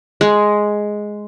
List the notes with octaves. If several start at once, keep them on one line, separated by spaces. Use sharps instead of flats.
G#3